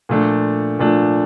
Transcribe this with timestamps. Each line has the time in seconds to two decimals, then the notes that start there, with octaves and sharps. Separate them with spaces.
0.09 A#2 F3 A3 D4
0.79 A#2 F3 A3 D4